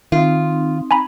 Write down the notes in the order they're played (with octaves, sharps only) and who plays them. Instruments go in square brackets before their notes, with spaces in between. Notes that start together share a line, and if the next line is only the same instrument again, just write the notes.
[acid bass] D#3 [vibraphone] C4 D#4 [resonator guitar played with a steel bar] F4
[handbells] G#5 A#5 B5